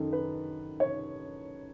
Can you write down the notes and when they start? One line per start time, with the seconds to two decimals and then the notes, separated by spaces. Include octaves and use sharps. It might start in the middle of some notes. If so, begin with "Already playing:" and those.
Already playing: F#2 D#3 A4
0.13 B4
0.80 C#5